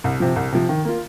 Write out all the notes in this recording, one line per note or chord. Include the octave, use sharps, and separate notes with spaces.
C2
C3 F3
C2
C3 F3
D#3
A#3 F4